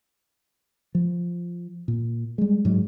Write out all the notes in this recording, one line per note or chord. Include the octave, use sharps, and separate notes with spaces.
F3
A#2
G3 G#3
G#2 F#3 G#3